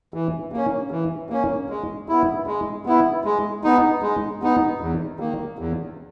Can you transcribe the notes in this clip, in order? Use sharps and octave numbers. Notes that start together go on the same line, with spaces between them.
E3
A#3 C#4
E3
A#3 C#4
G#3
B3 E4
G#3
B3 E4
G#3
B3 D#4
G#3
B3 D#4
E2
D#3 A#3
E2